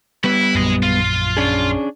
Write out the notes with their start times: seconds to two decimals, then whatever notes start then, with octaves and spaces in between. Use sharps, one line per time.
0.24 G3 B3 E4 B4
0.55 A#1 F#2 G#4 D#5
0.83 F4
1.37 C#4 D4 G#4